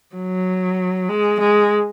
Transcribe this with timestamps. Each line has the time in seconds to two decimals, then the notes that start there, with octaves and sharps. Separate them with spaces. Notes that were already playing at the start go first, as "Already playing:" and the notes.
0.15 F#3
1.09 G#3
1.41 G#3